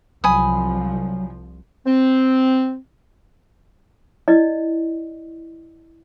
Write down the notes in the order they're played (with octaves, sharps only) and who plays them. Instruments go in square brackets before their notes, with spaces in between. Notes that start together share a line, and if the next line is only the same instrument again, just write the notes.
[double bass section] C2 F3 [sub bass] F#3 [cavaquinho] G#5 B5 D#6
[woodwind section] C4
[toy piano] E4 D5 D#5